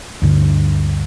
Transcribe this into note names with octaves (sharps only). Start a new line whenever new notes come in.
D2 G2 D3